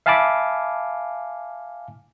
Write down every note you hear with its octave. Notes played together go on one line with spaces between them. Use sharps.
E5 F5 G#5 A5 B5 D6